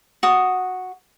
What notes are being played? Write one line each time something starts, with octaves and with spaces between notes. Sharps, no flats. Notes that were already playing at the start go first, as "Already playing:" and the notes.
F#4 D#6